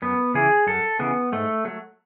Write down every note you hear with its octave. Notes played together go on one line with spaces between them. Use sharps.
F#2 B3
C#3 E3 G#4
F#2 A4
C#3 E3 B3
G#2 A3
F#3 A3